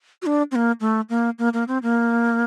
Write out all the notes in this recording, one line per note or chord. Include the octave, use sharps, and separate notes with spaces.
F#4
D4
C4
A#3
A3
A#3
A#3
A#3
C4
A#3